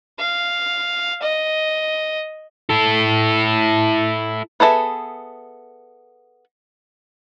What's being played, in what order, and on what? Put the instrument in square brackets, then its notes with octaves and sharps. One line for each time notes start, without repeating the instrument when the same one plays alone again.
[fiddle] F5
D#5
[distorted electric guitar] E4 A4
[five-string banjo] B3 G#4 A4 D#5 E5